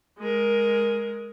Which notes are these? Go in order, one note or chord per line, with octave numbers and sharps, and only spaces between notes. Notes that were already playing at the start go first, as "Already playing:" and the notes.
G#3 A#4